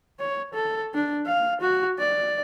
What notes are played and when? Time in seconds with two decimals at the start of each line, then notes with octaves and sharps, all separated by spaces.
0.20 C#5
0.54 A4
0.94 D4
1.26 F5
1.61 F#4
1.99 D5